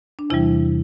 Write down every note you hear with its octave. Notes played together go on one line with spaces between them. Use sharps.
D4
E2 C3 E3 G3 E4